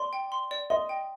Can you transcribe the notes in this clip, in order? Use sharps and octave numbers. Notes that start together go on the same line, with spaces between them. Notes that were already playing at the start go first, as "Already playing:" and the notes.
Already playing: D5 C6
G5
C6
D5
D#5 C6
G5